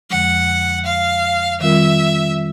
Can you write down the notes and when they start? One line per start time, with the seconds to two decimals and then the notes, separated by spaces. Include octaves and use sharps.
0.10 F2 D3 F3 G#3 F#5
0.86 F5
1.61 D#3 G3 C4 F4 A#4 E5